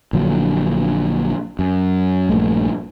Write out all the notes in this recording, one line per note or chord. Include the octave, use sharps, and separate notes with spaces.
A#1 D3 F#3
F#2
A#1 G2 A3